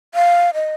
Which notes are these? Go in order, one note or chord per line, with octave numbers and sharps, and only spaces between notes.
F5
D#5